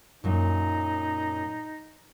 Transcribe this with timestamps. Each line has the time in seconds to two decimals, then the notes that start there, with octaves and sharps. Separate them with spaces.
0.24 F#2 A#2 D#4